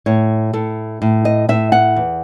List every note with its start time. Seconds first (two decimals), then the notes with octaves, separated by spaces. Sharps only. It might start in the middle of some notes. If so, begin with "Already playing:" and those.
0.06 A2 C#5
0.53 A2 A4
1.02 A2
1.25 D#5
1.49 A2 E5
1.72 F#5
1.96 E2